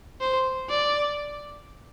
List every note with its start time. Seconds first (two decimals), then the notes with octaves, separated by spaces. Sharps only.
0.21 C5
0.69 D5